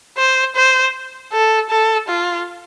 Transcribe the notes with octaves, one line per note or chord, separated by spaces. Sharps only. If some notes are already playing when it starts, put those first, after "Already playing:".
C5
C5
A4
A4
F4